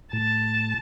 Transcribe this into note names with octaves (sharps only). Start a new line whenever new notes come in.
A2 A5